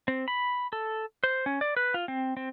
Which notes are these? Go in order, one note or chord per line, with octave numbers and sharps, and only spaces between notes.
C4
B5
A4
C5
C#4
D5
B4
F4
C4
C4